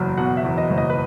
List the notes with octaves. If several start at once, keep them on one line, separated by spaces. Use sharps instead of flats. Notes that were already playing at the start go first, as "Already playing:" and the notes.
Already playing: F#1 E2 F#3
B2 F#5
E5
E2
D#5
F#1
D#5
B4